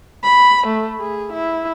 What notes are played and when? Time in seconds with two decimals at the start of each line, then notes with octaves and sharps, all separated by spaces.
0.23 B5
0.67 A3
0.99 G#4
1.33 E4